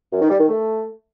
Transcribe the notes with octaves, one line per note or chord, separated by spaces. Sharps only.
F#2
D#3
G3
D#3
A3